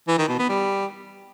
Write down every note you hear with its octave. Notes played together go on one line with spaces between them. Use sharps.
E3
D#3
B2
B3
G3